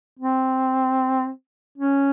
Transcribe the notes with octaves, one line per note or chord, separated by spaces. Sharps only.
C4
C#4